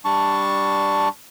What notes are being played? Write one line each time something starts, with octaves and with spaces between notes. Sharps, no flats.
G3 D4 A5 C#6